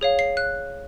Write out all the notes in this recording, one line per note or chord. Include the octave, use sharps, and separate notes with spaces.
G#4 C#5 F5
C7
F#6